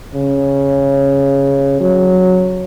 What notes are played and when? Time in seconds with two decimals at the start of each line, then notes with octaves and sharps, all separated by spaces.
0.14 C#3
1.80 F#3